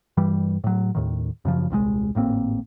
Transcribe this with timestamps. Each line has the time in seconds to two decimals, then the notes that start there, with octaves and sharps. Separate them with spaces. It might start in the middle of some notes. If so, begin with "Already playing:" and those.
0.17 G2 E3 G3
0.64 A2 F#3
0.95 D#2 A2 D#3
1.45 F#2 C#3 F3
1.70 D#1 C2 C3 G#3
2.15 G#1 A2 A#3 C4